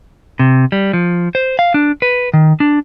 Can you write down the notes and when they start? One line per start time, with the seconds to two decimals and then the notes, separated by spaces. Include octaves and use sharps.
0.39 C3
0.72 G3
0.93 F3
1.35 C5
1.59 F5
1.74 D4
2.02 B4
2.34 D#3
2.60 D4